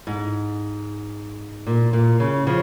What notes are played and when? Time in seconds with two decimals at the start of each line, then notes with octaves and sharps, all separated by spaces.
0.07 G#2
1.67 A#2
1.93 A#2
2.20 C#3
2.47 C#3 F3